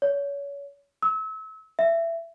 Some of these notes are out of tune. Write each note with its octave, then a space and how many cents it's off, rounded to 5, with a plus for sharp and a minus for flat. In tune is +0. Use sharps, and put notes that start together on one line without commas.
C#5 +30
E6 -35
E5 +20